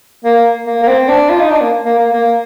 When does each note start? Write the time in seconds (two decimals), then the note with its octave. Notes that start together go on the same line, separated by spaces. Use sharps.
0.25 A#3
0.66 A#3
0.83 A#3
0.87 C4
1.08 D4
1.29 F4
1.40 D#4
1.50 D4
1.61 A#3
1.85 A#3
1.99 A#3
2.13 A#3